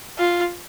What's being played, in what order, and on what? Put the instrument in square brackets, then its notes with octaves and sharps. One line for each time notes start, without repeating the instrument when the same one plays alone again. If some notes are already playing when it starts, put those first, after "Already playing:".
[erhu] F4